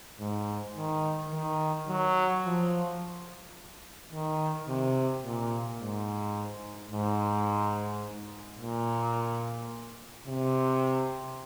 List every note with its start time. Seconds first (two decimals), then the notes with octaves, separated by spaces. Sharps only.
0.20 G#2
0.76 D#3
1.33 D#3
1.88 F#3
2.45 F3
4.13 D#3
4.68 C3
5.24 A#2
5.80 G#2
6.91 G#2
8.59 A#2
10.27 C3